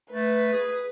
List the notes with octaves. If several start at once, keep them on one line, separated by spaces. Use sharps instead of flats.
A3 B4
G#4